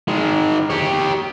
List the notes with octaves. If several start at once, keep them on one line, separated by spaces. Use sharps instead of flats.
D#3 G#3
G4 C#5